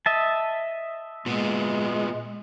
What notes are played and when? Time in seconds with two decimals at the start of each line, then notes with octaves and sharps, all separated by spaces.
0.06 D#5 E5 A5
1.26 A#2 G#3 B3